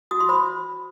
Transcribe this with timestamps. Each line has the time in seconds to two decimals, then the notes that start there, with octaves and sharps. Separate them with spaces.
0.11 F#4 D#6
0.20 C6
0.29 C5 B5